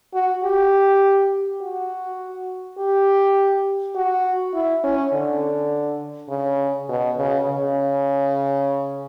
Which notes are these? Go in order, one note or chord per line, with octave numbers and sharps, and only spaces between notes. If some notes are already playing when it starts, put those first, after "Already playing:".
F#4
G4
F#4
G4
F#4
E4
C#4
D3
C#3
B2
C#3
C#3